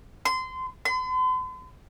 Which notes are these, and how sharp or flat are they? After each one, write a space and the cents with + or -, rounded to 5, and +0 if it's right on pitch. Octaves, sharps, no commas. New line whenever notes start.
C6 -25
C6 -45